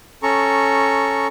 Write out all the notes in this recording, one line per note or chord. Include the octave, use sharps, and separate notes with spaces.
C#4 A4 A#5 C#6